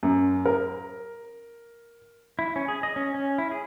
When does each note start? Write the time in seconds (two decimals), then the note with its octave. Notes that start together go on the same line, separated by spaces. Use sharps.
0.03 F#2
0.45 A#4
2.39 E4
2.56 C#4
2.68 G#4
2.83 D#5
2.96 C#4
3.15 C#4
3.38 E4
3.51 G#4